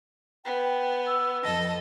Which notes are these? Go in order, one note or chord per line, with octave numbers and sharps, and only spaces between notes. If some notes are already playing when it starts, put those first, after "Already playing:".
B3 G5
E6
F2 A4 D#5 A#6